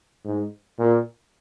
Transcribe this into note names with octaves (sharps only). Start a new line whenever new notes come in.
G#2
A#2